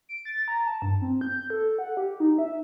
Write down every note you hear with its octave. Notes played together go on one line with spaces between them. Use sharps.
D7
A6
A#5
A5
G2
C4
G6
A4
F#5
G4
D#4
E5